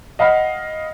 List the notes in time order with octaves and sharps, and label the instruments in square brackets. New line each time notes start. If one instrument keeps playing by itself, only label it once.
[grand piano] D#5 F5 F#5 B5 F6